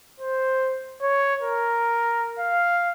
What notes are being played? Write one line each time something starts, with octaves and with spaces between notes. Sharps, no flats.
C5
C#5
A#4
F5